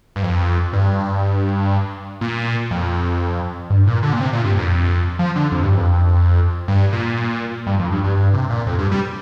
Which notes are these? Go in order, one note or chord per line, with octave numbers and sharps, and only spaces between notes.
G2
F2
G2
A#2
F2
G2
A#2
D3
A#2
C3
A#2
G2
F2
F3
D3
F2
G2
F2
G2
A#2
G2
F2
G2
G2
G2
C3
A#2
F2
G2
G3